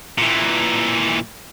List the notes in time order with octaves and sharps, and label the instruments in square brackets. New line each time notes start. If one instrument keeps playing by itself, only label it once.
[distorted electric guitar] A#2 E3